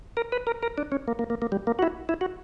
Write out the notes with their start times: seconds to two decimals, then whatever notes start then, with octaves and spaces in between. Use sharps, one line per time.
0.17 A#4
0.32 B4
0.47 A#4
0.63 A#4
0.78 D4
0.92 C#4
1.08 A#3
1.19 A#3
1.30 A#3
1.42 A#3
1.52 G3
1.67 A#3
1.79 F#4
1.83 E4
2.09 E4
2.21 F#4